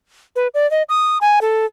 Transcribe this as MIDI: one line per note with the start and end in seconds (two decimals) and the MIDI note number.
0.36 0.48 71
0.54 0.69 74
0.71 0.83 75
0.89 1.18 87
1.21 1.39 80
1.41 1.66 69